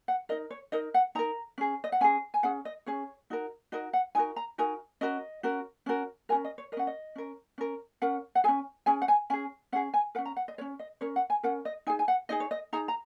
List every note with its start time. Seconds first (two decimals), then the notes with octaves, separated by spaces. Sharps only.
0.08 F#5
0.29 D#4 A#4 D#5
0.50 C#5
0.72 D#4 A#4 D#5
0.94 F#5
1.15 D#4 A#4 A#5
1.58 C#4 G#4
1.84 D#5
1.92 F#5
2.01 C#4 G#4 G#5
2.34 G#5
2.43 C#4 G#4 F#5
2.65 D#5
2.86 C#4 G#4 C#5
3.30 D#4 F#4 A#4
3.72 D#4 F#4 A#4 D#5
3.93 F#5
4.15 D#4 F#4 A#4 G#5
4.36 A#5
4.58 D#4 F#4 A#4 G#5
5.01 C#4 F#4 A#4 D#5
5.43 C#4 F#4 A#4
5.86 C#4 F#4 A#4
6.29 C#4 F#4 A#4 G#5
6.44 D#5
6.58 C#5
6.72 A#4 D#5
6.77 C#4 F#5
6.87 D#5
7.16 C#4 A#4
7.58 C#4 A#4
8.02 C#4 A#4 F#5
8.35 F#5
8.44 C#4 G#4 G#5
8.86 C#4 G#4 G#5
9.02 F#5
9.08 G#5
9.30 C#4 G#4 G#5
9.72 C#4 F#5
9.76 G#4
9.94 G#5
10.15 A#4 F#5
10.18 C#4
10.25 A#5
10.36 F#5
10.48 D#5
10.58 A#4 C#5
10.61 C#4
10.79 D#5
11.01 C#4 A#4 C#5
11.16 F#5
11.30 G#5
11.43 C#4 A#4 F#5
11.65 D#5
11.87 D#4 G#4 G#5
11.99 G#5
12.08 F#5
12.29 D#4 G#4 D#5
12.40 C#5
12.51 D#5
12.73 D#4 G#4 A#5
12.88 A#5